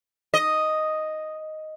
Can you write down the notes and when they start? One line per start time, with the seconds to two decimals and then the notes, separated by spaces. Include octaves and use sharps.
0.34 D#5